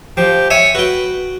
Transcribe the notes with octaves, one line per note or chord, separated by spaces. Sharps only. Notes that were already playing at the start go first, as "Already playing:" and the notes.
F3 G4
C#5 E5 G#5
F#4 B4 G5